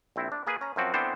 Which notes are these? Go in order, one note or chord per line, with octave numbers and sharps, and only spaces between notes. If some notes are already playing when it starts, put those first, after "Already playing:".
A#1 C4 E4
D4
A#3 G#4 B4
C#4 A#5
F#2 F3 C4 F#4
E3 B3 C4 D4 A4 C5